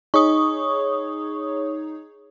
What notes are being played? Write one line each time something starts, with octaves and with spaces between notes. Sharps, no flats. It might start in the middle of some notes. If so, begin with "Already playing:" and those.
D#4 G#4 C#5 C#6 D#6